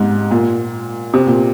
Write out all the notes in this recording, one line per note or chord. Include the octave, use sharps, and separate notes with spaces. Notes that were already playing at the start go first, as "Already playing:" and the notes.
Already playing: G#2 C3
A#2
C3
A#2